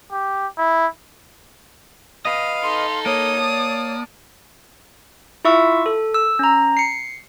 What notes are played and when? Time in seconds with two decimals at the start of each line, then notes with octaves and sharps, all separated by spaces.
0.12 G4
0.58 E4
2.25 B4 D#5 F5
2.62 D#4 A4 C6
3.06 A#3 C#5 D#6
3.37 D5 A5
5.45 E4 F4 E5 C#6 E6
5.86 A4
6.14 E6
6.39 C#4 A#5
6.77 C7 C#7